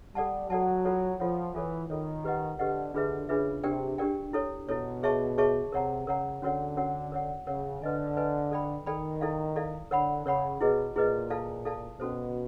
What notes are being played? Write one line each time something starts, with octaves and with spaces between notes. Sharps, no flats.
G3 A4 D5 F#5 A5
F#3 A4 D5 F#5 A5
F4 A4 C#5 F#5
F3 F4 A4 C#5 F#5
E3 F4 A4 C#5
D#3 F4 A4 C#5
G4 B4 D#5 F#5
D3 G4 B4 D#5 F#5
D3 D4 F4 G#4 B4 E5
C#3 D4 F4 G#4 B4 E5
C3 D4 G4 A#4 D5 G5
D4 G4 A#4 D5 G5
E4 A4 C#5
B2 E4 A4 C#5
G#4 C#5 E5 A5 C#6
G#4 C#5 E5 A5 C#6
C3 A#4 C#5 F#5 A#5
C#3 A#4 C#5 F#5 A#5
D3 C#4 F#4 A#4 C#5 F#5
C#4 F#4 A#4 C#5 F#5
A#4 C#5 F#5
C#3 A#4 C#5 F#5
D3 B4 D#5 G#5
B4 D#5 G#5
A4 D5 G5 B5
D#3 A4 D5 G5 B5
E4 A4 D5 F5
E4 A4 D5 F5
D3 A#4 C#5 F#5 B5
C#3 A#4 C#5 F#5 B5
B2 E4 G#4 B4 D#5
A#2 E4 G#4 B4 D#5
E4 A4 D5 F5 A5
E4 A4 D5 F5 A5
B2 C#4 F#4 A4 C5